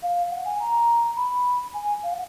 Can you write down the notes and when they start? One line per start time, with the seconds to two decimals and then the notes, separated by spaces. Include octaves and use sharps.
0.02 F5
0.31 F#5
0.45 G#5
0.60 A#5
1.17 B5
1.74 G#5
2.03 F5
2.13 F#5